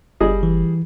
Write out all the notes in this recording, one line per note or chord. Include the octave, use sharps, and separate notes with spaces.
F#1 G3 G#4 D#5
E3